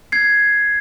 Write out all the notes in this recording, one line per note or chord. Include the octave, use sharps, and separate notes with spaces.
G#6 C7